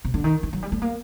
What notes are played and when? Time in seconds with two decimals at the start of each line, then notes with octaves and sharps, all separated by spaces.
0.05 C3
0.14 D3
0.24 D#3
0.43 D#3
0.53 F#3
0.63 G3
0.72 A3
0.82 A#3